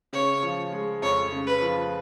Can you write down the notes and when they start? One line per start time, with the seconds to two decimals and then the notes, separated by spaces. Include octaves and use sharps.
0.13 C#3 C#5
0.43 F3
0.72 G#3
1.02 F2 C#5
1.32 C#3
1.47 B4
1.62 F3